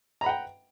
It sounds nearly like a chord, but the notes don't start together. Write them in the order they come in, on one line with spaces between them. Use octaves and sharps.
A#5 B5 F#5 G5